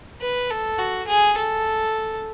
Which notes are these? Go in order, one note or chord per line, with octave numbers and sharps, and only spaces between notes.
B4
A4
F#4
G#4
A4